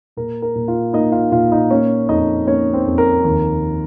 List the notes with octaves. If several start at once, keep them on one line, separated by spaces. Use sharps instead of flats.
A#2 A#4
A#4
A#2
F4 F5
A#3 D#4 D#5
F4 F5
A#2 F4 F5
D#4 D#5
A#3 C#4 C#5
F2 D#4 D#5
A#3 C#4 C#5
C4 C5
F2
A#4
D#2